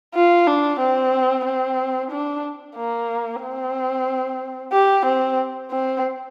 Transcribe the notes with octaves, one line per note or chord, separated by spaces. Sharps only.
F4
D4
C4
C4
D4
A#3
C4
G4
C4
C4